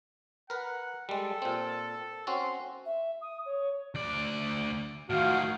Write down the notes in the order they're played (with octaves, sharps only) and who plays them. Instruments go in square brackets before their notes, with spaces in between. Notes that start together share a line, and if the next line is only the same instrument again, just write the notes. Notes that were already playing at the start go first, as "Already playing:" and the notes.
[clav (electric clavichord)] A#4 B4 [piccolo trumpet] F#5
[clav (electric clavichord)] G3 G#3 [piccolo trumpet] A4
[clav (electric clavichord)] A#2 C4
[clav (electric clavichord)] C4 C#4 F#4 [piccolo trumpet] C6
[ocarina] E5
D#6
C#5
[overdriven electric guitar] D2 D5
[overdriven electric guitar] A2 D#3 [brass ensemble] F4 F#4 F5